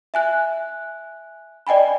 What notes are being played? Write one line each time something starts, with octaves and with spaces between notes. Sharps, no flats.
E5 G#5 F#6
D5 D#5 G5 G#5 B5